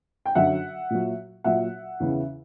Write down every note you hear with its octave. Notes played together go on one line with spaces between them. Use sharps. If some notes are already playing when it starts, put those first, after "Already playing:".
G5
F#2 D3 F#3 E5 F#5
A#2 F#3
A#2 F#3 E5 F#5
E2 C#3 E3